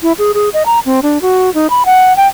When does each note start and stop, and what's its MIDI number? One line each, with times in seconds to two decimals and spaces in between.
0.03 0.12 64
0.19 0.32 68
0.34 0.49 68
0.54 0.63 75
0.66 0.79 82
0.86 1.00 60
1.03 1.21 62
1.22 1.53 66
1.54 1.67 63
1.70 1.83 83
1.85 2.15 78
2.17 2.27 79